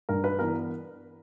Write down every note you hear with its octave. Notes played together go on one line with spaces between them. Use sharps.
G2 A#4
B4
E3 B3 D4 A#4